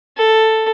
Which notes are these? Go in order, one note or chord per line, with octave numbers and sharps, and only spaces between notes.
A4